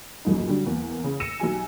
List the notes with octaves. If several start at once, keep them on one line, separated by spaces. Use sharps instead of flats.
F1 C#2 F#2 A#2 D#4
D3 F#3 G3 D4
E2 A#3
C#3
E6 A#6 C#7 D#7 E7
B1 F#3 G4 G#5